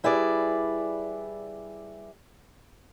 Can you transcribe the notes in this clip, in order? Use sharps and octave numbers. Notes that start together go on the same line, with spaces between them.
G3 E4 G#4 B4 D5